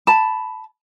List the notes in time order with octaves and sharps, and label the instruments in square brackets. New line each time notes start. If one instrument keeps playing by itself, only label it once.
[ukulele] A5 B5